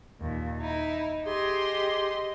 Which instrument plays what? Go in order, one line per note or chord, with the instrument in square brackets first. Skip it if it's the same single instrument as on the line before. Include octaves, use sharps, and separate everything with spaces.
[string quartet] D#2 A#2
D#4 E4
[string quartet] G4 D#5 C6 [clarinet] G#4